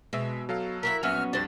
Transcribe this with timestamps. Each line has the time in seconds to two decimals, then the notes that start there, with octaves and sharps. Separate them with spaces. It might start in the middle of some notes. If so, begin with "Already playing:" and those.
0.13 B2 G#3 E5
0.49 F#3 A4 F5
0.83 E4 F#4 A#4 B6
1.03 A#1 F#3 B3 C#4 E5 G#5 F6
1.33 F2 G3 D4 F#4 C5 A6